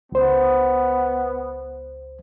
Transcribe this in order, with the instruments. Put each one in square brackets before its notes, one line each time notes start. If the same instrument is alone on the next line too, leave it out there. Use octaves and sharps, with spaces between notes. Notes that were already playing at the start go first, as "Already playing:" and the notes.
[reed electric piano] C#2 C5 [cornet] B3